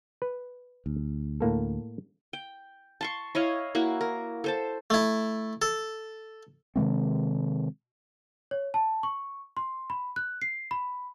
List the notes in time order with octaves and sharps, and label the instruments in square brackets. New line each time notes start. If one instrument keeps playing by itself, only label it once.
[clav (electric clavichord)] B4
[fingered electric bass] D2
[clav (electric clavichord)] A2 A#3 A4
[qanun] G5
A5 C6 C#6
E4 C#5 D#5 F5
A#3 E4 F#4
A#4
A4 C5 A5
[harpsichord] A3 E4
A4
[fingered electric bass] C3 D#3 G#3 C4
[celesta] C#5
A5
C#6
C6
B5
F#6
C7
B5